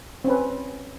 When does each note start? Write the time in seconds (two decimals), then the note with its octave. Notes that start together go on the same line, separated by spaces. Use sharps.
0.24 C4
0.27 C#4
0.30 B4